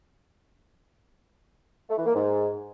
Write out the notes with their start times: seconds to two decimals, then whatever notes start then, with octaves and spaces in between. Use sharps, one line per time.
1.89 A3
1.98 E3
2.06 A#3
2.15 G#2